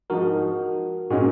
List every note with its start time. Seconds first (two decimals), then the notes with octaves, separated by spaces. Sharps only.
0.10 G#2 F3 G#3 D#4 F#4 A#4
1.10 A#2 G#3 C#4 D#4 F#4